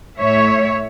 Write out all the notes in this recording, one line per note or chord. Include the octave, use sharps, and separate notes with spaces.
A2 C#5 E5